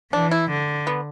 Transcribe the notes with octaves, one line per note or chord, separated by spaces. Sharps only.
E3 D4
E4
D3
B3